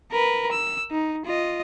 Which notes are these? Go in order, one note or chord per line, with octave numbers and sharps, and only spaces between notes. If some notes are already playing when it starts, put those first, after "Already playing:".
A#4 B4
E6
D#4
F4 D#5